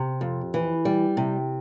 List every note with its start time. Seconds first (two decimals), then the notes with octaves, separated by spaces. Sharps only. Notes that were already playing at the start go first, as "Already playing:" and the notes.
Already playing: C3
0.21 F2
0.54 E3
0.85 G3
1.17 C3